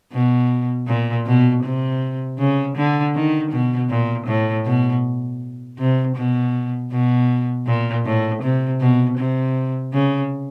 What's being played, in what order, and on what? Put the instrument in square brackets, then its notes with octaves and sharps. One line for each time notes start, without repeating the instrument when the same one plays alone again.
[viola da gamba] B2
A#2
B2
C3
C#3
D3
D#3
B2
A#2
A2
B2
C3
B2
B2
A#2
A2
C3
B2
C3
C#3